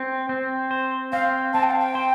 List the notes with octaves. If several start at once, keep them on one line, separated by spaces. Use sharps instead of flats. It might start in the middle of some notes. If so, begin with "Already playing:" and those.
Already playing: C4
C4
C5
C4 F5
C4 A5
G5
F5
G5
C5